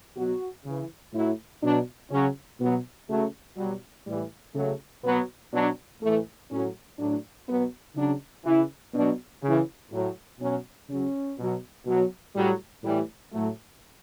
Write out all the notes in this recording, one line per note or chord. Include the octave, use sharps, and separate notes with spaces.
B2 F#3 F#4
C#3 E3
A2 F#3 E4
B2 F#3 D4
C#3 F#3 C#4
B2 F#3 B3
C#3 F#3 A3
B2 F#3 G3
A2 E3 G3
C#3 F#3 A3
B2 F#3 B3
B2 F#3 D4
A2 E3 A3
A2 F#3 C#4
A2 F#3 D4
B2 F#3 B3
C#3 F#3 D4
C#3 E3 E4
B2 F#3 D4
C#3 E3
A2 F#3
B2 F#3 C#4
C#3 F#3 C#4
B2 F#3
B2 F#3
A2 F#3 G3
A2 E3 G3
A2 F#3 A3